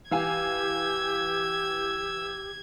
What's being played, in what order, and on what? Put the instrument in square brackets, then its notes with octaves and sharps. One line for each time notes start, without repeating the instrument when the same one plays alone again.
[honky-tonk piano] E3 F5 G#5 [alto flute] G4 [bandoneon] E6 [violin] G#6